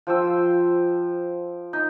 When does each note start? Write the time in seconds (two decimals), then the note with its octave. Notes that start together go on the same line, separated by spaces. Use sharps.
0.07 F3 C5 G5 E6
1.73 D#4